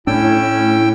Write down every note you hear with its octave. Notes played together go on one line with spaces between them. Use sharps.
A2 C#4 D4 E4 G5 E6